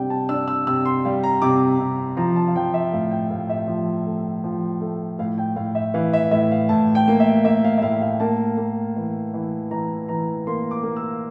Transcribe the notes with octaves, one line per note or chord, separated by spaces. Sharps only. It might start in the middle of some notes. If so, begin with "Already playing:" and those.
Already playing: C3 G3 D4 G5
A5
D4 E6
E6
C3 E6
C6
G3 F5
A#5
C3 D6
C3
F3 A#5
A5
F5
F3 G5
E5
A2 F5
G5
A2 F5
E5
F3
A3
F3
A3
A2 F5
G5
A2 F5
E5
E3 F5
E5
A2 E5
F5
A2 A5
G5
A#3
E5
A#3 E5
F5
E5
A2 F5
F5
A#3 A5
A#3
E3
E3
E3 A#5
E3 A#5
A#3 C6
D6
A#3
E6